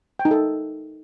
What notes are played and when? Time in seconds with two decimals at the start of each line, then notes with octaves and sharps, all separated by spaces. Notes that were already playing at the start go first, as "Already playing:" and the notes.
0.19 G5
0.25 D#4
0.31 A4